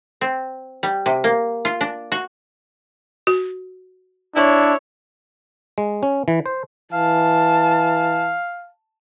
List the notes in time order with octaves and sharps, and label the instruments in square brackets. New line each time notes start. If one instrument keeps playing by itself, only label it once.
[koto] C4
G3
C3
A#3
F4
D4
F#4
[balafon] F#4
[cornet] D4 [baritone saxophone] E4 [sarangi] C#5
[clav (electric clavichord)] G#3
C#4
E3
C5
[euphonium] E3 [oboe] F5 [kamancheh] A5